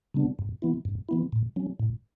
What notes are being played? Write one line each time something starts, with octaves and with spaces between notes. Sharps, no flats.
C#3 G3 B3 D4
G2
E3 B3 E4
G2
E3 B3 E4
A2
F#3 C#4
A2